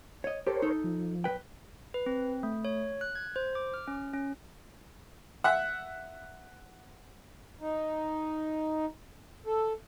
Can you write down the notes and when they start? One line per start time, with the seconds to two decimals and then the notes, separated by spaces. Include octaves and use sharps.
0.24 C#5 D#5
0.47 G4 A4 A#4 C5 C#5
0.62 D#4 A4
0.84 F3
1.24 B1 B4 G5
1.94 B4
2.06 C4
2.43 A3
2.65 C#5
3.01 F#6
3.15 G#6
3.36 C5
3.55 D6
3.74 F6
3.88 C#4
4.13 C#4
5.44 E5 F#5
7.61 D#4
9.46 A4